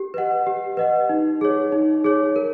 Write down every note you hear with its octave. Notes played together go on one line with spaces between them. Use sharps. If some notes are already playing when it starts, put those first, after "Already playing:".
Already playing: G4
B4 D#5 F#5
G4
B4 D#5 F#5
D#4
G#4 C#5
D#4
G#4 C#5
A#4